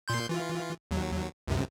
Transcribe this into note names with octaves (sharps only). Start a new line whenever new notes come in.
A#2 C6 G6
E3 F4
D#2 F#3
C#2 F#2 C3